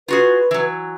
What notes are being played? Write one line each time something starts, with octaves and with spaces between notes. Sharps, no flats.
F4 F#4 G#4 B4
E3 F#3